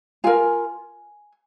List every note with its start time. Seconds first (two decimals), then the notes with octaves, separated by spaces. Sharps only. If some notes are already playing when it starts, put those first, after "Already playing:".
0.24 F4 A#4 G#5